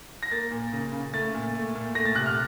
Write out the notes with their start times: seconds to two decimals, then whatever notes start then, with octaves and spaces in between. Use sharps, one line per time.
0.23 A#6
0.32 A#3 A6
0.51 A#2
0.72 C#3
0.92 C#3
1.13 A3 A6
1.34 A#2
1.54 A3
1.75 A#2
1.95 A3 A#6
2.05 A6
2.15 C3 F#6
2.26 F6